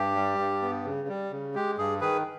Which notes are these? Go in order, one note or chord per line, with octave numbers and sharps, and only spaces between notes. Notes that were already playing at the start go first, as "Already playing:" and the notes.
Already playing: G2 G4
G3
G2
B3
C#3
G3
C#3
G#3 G4
G2 G#4
D#3 G#4 B4